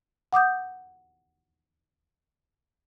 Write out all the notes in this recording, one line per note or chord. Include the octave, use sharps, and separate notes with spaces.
F#5 D6 D#6 G6